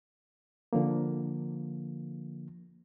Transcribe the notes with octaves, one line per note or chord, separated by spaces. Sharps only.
D3 F3 A#3